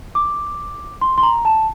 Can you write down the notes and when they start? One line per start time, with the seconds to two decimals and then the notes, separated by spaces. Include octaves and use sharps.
0.15 D6
1.01 C6
1.18 C6
1.23 A#5
1.45 A5